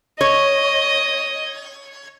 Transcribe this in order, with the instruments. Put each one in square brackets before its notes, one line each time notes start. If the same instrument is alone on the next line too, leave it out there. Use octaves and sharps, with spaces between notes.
[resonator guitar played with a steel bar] C#5 [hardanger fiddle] D#5